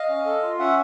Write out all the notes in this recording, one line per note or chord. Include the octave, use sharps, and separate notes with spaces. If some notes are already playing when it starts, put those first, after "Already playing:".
Already playing: D#5 F5
C#4
A4
F4
C#4 E5 F#5